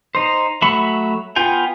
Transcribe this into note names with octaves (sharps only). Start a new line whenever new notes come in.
D#4 C5
F#3 A3 E5 B5 C#6
B3 F4 G5 G#5